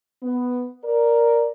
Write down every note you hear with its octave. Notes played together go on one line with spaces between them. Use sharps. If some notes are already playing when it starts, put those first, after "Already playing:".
B3
A#4 D5